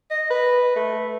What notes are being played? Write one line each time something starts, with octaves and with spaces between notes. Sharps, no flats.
D#5
B4
A3